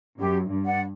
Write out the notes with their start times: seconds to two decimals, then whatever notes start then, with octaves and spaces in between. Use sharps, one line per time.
0.19 F#2 G4
0.49 G2
0.65 D5 F#5